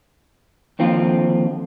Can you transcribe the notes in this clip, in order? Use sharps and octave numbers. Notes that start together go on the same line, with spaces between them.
D#2 D3 F3 C4 F4